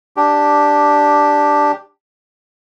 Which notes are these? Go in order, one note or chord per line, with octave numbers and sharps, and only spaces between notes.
D4 G4